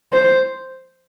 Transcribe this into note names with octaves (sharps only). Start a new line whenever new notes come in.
C5